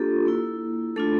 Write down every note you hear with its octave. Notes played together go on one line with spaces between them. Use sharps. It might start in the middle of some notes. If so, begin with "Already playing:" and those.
Already playing: A#3 D4 F4 G4 A4
A#3 E4
A3 D4 F4 A4